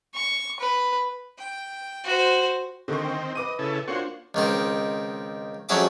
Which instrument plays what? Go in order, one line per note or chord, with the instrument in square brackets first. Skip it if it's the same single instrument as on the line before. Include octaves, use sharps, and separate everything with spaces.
[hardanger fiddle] C#6
B4
G5
F#4 C5
[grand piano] D3 A#3 C#6 [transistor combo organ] D#3 C4
[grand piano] G5 C#6
[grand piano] B4 D6 D#7 [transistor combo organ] D#5
[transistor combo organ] C#3 E4 A4
[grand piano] A#3 D4 F4 [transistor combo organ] F#4 C5 C#5
[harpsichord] C#2 D#3 C4
F2 F#3 C#4 G#4 E5 D6